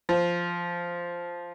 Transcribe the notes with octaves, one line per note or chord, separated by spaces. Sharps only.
F3